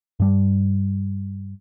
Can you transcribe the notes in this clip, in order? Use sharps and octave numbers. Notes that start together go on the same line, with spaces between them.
G2 G3